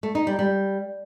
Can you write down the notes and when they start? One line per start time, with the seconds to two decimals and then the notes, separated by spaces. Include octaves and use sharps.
0.03 A3
0.15 D#4
0.27 G3
0.39 G3